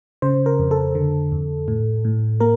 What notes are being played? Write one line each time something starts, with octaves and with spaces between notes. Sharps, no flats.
C#3 C5
A#4
F2
A4
D3
F2
A2
A2
A#3 A#4